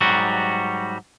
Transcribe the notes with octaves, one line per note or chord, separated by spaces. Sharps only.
G#2 F#3 G3 F#4